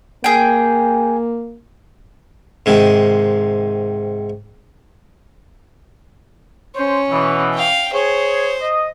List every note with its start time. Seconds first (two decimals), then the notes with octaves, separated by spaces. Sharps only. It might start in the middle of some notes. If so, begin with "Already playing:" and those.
0.24 A#3 G#4 G5
2.66 G#2 C3 D#3
6.76 C#4 C5
7.09 B2 E3
7.55 F5 G5
7.93 G#4 C5 C#5
8.61 D#5